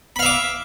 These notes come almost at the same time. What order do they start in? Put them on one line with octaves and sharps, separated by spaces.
B5 F5 E5 D6